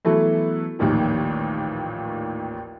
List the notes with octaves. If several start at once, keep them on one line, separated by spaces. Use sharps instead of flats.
E3 F#3 A3 B3 E4 A4
A1 D#2 A#2 D#3 F3